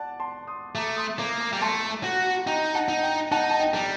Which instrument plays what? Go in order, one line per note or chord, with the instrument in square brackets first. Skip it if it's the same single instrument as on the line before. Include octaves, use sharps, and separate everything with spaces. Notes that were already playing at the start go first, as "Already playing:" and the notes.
Already playing: [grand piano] D5 F#5 A5
A5 C6
C6 D#6
[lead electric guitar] A3 [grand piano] A#5 D6
[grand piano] C6 D#6
[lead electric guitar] A#3 [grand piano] A#5 D6
[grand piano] A#5 D6
[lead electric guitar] G3
[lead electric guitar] A3 [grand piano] A5 C6
[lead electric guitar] F#4
[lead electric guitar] D#4 [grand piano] G5 A#5
[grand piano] F#5 A5
[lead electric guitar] D#4
[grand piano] G5 A#5
[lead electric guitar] D#4 [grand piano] F#5 A5
[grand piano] A5
D#5 G5
[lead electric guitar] G3